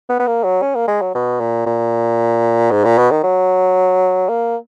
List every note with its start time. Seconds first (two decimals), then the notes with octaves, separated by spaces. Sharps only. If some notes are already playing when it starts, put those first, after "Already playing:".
0.09 B3
0.19 B3
0.27 A#3
0.44 F#3
0.62 C#4
0.75 A#3
0.88 G#3
1.01 F#3
1.15 B2
1.40 A#2
1.66 A#2
2.71 G#2
2.84 A#2
2.98 B2
3.11 D#3
3.23 F#3
4.29 A#3